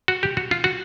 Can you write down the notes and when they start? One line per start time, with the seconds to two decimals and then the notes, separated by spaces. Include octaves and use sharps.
0.08 F#4
0.23 G4
0.37 F#4
0.51 F4
0.64 F#4